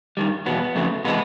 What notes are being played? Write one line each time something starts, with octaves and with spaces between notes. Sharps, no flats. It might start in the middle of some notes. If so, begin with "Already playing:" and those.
G2 D#3 G3
E2 B2 F#3 B3
F2 C#3 F#3 A3
C3 E3 G#3 B3